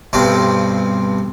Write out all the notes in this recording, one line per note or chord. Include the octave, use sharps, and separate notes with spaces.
B1 G2 C4 D4 D6